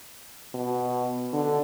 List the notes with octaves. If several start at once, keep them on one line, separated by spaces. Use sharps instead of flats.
B2
D3